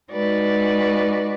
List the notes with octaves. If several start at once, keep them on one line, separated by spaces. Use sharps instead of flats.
G#3 D#4 F#4 B4 D5